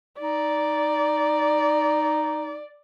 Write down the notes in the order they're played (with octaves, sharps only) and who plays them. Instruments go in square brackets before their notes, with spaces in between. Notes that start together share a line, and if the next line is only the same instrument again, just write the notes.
[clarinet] D#4 [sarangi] D5